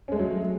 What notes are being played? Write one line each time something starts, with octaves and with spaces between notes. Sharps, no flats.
F#3 G#3 A3 C#4